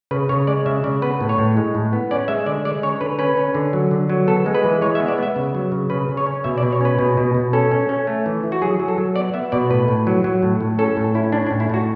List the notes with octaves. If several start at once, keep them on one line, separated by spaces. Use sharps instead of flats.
C#3 B4
C#3 C#5
G#3 D5
C#3 E5
C#3 D5
B3 B4
A2
C#5
A2
G#3
A2
B3
C#4 D5
G#3 E5
D3 D5
G#3 D5
C#4 C#5
D3 B4
C#4 B4
C#4
D3
F#3
D3
F#3
B3 A4
G#3
B4
E3
G#3 C#5
E5
B3
D5
B3 E5
C#3
F#3
C#3
C#3 B4
C#3
C#5
C#4
B2 E5
D5
B2
C#5
C#4 B4
B2
B2
B2
C#4 A4
C#4
C#4
A3
E3
E3
F#4
F#3 G#4
F#3
A4
F#3
B3 D5
B3 E5
B2 D5
A2 B4
A2
F#3
F#3
A2
A2
C#4 A4
A2
C#4 E4
C#4 D4
D4
A2
E4
A2 F#4